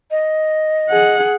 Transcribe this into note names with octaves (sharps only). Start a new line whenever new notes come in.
D#5
G#4 F#5